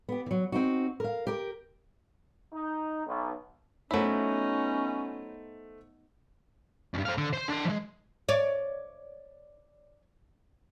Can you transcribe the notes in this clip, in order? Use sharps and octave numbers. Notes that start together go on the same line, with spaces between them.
B3 G4
E3 F#3
C4 D#4 F#4
A#4 F5
G4 A#4
D#4
B1
F#3 A3 B3 C#4 D#4 E4 C5
C#2 G2
C4 F5
D3
C5 C6
D4 C6
F3 G#3
C#5 D5